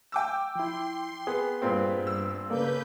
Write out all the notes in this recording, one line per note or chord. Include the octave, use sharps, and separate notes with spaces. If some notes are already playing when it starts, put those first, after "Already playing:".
G5 D6 E6
F3 E4 C6
B3 G#4
G2 A#2 B3 C4
E6
C#3 A#3 A4 B4 D5 G6